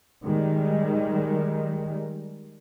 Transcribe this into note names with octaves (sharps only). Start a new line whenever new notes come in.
D#3 G3 G#3